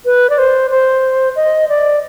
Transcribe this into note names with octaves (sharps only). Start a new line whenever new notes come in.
B4
D5
C5
C5
D#5
D5